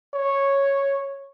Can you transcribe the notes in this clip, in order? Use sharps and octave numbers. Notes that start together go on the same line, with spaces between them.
C#5